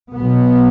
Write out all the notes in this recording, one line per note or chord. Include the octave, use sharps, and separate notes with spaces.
B1 B2 B3